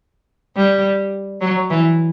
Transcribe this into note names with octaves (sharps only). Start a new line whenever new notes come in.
G3
F#3
E3